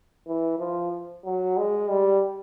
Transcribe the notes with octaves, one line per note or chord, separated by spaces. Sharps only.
E3
F3
F#3
G#3
G3